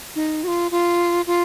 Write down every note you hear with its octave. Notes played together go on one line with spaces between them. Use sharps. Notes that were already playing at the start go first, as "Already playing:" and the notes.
D#4
F#4
F4
F4
F4